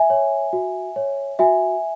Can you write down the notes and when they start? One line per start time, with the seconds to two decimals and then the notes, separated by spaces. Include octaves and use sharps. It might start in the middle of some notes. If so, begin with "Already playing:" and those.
Already playing: E5 G#5
0.10 C#5
0.53 F#4
0.96 C#5
1.39 F#4 E5 G#5